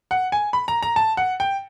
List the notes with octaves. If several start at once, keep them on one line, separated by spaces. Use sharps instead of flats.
F#5
G#5
B5
A#5
A#5
A5
F#5
G5